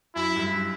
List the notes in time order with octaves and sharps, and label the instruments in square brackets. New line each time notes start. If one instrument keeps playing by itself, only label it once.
[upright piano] F#2 [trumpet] E4
[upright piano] G2